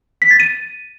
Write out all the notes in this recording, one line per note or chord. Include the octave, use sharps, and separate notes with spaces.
B6
A6
D#7